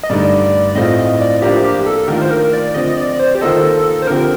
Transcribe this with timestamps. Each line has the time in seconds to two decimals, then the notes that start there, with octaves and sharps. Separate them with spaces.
0.03 D#5
0.10 G2 D3 A3 D#4 D5
0.75 A2 A3 C4 F4 D#5
0.98 D#5
1.20 D5
1.42 F3 A#3 D4 F4 G4 C5
1.64 G4
1.86 A4
2.08 D#3 A3 D4 F4 A#4
2.22 C5
2.31 A#4
2.53 D5
2.74 D3 F3 C4 D#5
2.97 D5
3.20 C5
3.35 G4
3.41 D#3 A#3 F4 A4 C5 D#5
4.02 C5
4.07 D3 F3 C4 G4 A#4